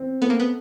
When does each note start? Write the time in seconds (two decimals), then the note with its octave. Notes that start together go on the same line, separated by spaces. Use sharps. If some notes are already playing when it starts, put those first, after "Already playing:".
Already playing: C4
0.22 A3 B3
0.30 A#3
0.40 B3